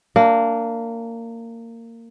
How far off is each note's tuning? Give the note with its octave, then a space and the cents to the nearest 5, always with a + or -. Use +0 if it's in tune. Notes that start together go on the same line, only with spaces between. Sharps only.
A#3 -20 D4 +0